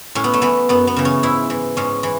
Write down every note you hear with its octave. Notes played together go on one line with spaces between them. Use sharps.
A2 C#4
B3
A3
E3 B3
F#2 B3
B3
C#3 E3
C#4
G#2 E4
E3
G#2 C#4
E3